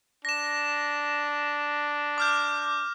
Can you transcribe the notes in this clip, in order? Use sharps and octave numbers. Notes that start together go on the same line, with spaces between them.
D4 A#6 E7
D6 F6 G6